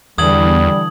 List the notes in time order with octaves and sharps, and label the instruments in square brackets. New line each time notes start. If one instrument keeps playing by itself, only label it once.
[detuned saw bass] E2 [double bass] D3 E3 [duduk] G3 [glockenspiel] D#6 G#6 F#7